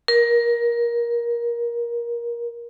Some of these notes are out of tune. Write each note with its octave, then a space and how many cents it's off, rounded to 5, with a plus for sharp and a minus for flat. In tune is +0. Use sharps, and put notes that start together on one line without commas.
A#4 +20